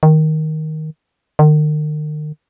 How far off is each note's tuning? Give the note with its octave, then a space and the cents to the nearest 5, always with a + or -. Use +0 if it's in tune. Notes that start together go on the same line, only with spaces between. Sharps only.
D#3 +5
D#3 -40